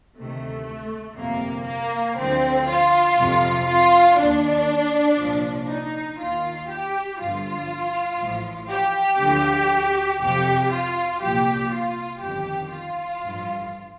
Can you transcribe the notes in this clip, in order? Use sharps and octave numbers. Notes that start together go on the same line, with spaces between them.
D2 C3 D#3 A3
G1 F2 C3 A#3
A#3
D2 D3 F3 C4
F4
F2 C3 F3
F4
D#2 D#3 D4
C2 A#2 F3
D#4
D#2 D#3 F4
G4
G1 G2 D3 F3 F4
A1 A2 F3
G4
D2 D3 F3
F2 C3 F3 G4
F4
C2 A#2 F3 G4
F4
G1 F2 D#3 G4
F4
A1 G2 F3